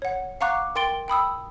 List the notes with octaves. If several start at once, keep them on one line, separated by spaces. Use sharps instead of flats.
C#5 F#5
F5 F#5 A#5 C#6 D6 F#6
A#4 G5 C6 A6 D7 G7
G5 B5 D#6 E6